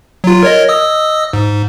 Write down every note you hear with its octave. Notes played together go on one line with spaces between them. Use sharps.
F#3 F4
A#4 C#5 D#5
D#5 D#6 E6
G#2